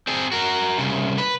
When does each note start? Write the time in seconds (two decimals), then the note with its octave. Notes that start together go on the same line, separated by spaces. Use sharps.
0.07 C4 G#4
0.32 F#4 A#4
0.78 C2 C#3
1.18 B4